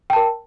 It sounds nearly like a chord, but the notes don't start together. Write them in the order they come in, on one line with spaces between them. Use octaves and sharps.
G5 A5 A#4